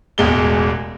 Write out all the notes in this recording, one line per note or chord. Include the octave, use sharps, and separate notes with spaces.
E1 A1 E2 G#3 G7